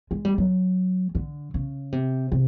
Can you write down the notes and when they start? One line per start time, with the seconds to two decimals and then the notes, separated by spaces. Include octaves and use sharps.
0.11 G#3
0.25 G3
0.38 F#3
1.15 D3
1.54 C#3
1.92 C3
2.32 C3